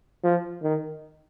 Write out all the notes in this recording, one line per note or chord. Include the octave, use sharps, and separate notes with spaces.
F3
D#3